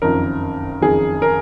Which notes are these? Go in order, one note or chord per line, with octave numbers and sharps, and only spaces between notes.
F#1 F2 D#3 A#4
F#1 F2 D#3 G#4
A#4